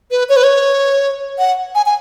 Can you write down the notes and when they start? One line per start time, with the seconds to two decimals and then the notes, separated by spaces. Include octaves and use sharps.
0.11 B4
0.29 C#5
0.36 B4
0.43 C#5
1.39 F#5
1.75 G#5
1.86 G#5